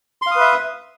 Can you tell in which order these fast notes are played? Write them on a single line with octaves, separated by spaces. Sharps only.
C6 F5 D#6 B4 E5